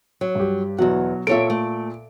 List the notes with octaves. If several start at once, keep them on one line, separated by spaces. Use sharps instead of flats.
F#3
G2 G4
E2 B2 F#3 F#5
A#2 A4 C#5 E5 D7
A3